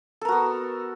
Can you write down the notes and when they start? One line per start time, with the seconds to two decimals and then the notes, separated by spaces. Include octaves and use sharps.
0.21 A4
0.25 A#4
0.28 F#4
0.32 B3